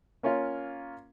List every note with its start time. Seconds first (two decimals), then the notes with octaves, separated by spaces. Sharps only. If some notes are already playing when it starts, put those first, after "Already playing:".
0.23 A#3 C#4 F4